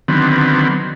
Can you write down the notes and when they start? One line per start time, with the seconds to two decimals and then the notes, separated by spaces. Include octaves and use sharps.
0.08 D3 D#3 F#3 B3 C4